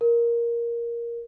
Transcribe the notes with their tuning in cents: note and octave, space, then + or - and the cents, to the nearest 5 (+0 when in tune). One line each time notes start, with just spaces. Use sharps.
A#4 +10